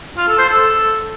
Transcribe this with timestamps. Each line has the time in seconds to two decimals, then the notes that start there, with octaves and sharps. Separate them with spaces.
0.17 F4
0.27 A4
0.38 C5
0.49 A4